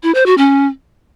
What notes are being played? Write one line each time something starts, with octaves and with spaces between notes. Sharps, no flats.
E4
C5
F#4
C#4